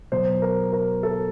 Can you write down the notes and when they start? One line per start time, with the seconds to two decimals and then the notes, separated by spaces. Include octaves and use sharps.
0.12 B2 F#3 C5
0.42 A#4
0.72 A#4
1.03 A4